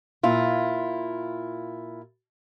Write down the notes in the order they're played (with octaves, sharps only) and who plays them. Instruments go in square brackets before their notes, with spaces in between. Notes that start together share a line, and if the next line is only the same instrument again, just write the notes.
[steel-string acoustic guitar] A#2 E4 F4